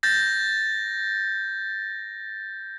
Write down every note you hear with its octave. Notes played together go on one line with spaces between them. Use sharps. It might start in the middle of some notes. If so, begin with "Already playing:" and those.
G6 A6 A#6